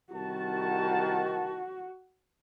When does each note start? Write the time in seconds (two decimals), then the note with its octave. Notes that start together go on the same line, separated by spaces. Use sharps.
0.13 C2 D#3 F#4 A5